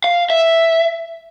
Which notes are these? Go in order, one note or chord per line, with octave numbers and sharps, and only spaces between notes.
F5
E5